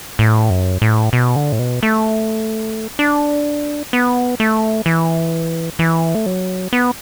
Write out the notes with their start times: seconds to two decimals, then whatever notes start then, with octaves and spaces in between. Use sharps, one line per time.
0.19 A2
0.50 F#2
0.82 A2
1.13 B2
1.36 D3
1.52 A2
1.59 B2
1.83 A3
2.99 D4
3.93 B3
4.40 A3
4.86 E3
5.79 E3
6.15 A3
6.26 F#3
6.73 B3